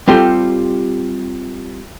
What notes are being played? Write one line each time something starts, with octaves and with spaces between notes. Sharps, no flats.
G3 C4 F4 G4 A4